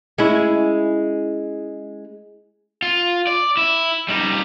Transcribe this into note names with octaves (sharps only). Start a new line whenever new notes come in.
G#3 C#4 E4
F4
D5
E4
G3 D#4